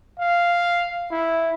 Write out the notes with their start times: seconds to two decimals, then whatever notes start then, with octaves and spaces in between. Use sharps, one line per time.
0.20 F5
1.11 E4